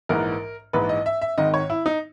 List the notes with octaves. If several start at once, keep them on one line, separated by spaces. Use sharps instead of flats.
A#1 G#2 E3 A#4
A#1 G#2 E3 B4
D#5
E5
E5
G#1 G#2 D#3 D#5
C#5
E4
D#4